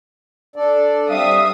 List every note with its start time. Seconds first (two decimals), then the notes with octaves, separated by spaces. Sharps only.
0.56 D4 A4 D5
1.09 G3 C4 E5 F5 D#6